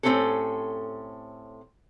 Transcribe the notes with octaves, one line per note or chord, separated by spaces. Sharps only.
A2 F#3 C4 C#4 G4 A4